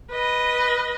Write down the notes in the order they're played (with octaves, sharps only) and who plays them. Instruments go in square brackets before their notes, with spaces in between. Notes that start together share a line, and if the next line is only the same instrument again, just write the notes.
[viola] B4 D#5